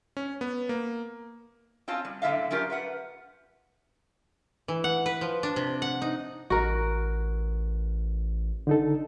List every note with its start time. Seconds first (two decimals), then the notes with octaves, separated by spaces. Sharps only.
0.17 C#4
0.41 B3
0.69 A#3
1.88 C4 C#4 F4 A5
2.05 G3
2.22 F#2 A2 D3 E5 F5
2.51 F#3 C#4 D4 F4 G4 A#4
2.70 B4 E5 F#5
4.68 E3
4.84 F#5
5.06 B4
5.21 F3
5.43 D4
5.56 C3
5.82 F#5
6.02 D#4
6.50 A1 F#4 A#4
8.67 D3 D#4 A4